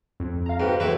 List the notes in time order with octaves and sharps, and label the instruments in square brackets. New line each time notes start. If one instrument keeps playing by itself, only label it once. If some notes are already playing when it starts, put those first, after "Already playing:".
[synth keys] F2
F5 A#5
[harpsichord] G#2 [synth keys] F#4 B4 G5
[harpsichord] A2 E4 B4 [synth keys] E3 A3